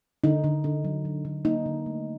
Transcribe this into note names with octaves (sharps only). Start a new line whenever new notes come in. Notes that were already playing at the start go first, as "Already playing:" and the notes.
D3 D#4
D3
D3
F#3
F#3
D3
A#3 D#4
D3
A3